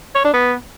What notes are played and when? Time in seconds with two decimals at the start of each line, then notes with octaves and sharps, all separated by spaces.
0.15 C#5
0.24 D4
0.34 B3